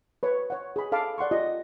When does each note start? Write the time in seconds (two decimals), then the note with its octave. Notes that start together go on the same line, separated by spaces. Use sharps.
0.23 B4 C#5 C#6
0.50 C#5 F#5
0.76 G#4 B5
0.92 A4 F5 A5 B5 D6
1.18 D5 F#5 C6 C#6
1.31 F4 G4 D#5